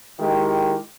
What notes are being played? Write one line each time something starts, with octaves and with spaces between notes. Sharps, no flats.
D#3 G#3 E4 G4